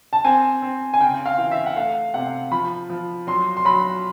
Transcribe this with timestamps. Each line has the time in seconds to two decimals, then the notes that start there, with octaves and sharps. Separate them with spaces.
0.13 A5
0.25 C4 G#5
0.62 C4
0.94 G#5
1.00 C#3 G5
1.26 F5
1.38 E3
1.51 E5
1.66 F#5
1.76 A3 F5
2.14 C3 F#5
2.51 F3 B5
2.90 F3
3.27 F#3 C6
3.57 C6
3.65 F#3 B5